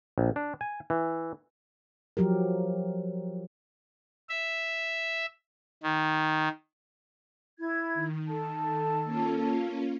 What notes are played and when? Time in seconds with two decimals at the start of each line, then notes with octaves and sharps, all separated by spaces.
0.18 A#1
0.36 D4
0.61 G#5
0.90 E3
2.17 F3 F#3 G4 A#4
4.29 E5
5.83 D#3
7.58 E4 G#6
7.94 D#3
8.28 A4 A5
9.04 A#3 C#4 F4